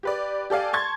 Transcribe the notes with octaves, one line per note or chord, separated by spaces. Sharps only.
G4 B4 D5
G4 A4 D5 F5 G#5
A5 C6 C#6 G#6 A6